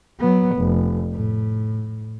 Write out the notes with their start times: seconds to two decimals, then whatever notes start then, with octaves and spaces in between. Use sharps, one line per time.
0.20 F#3 B3
0.57 F1
1.12 A2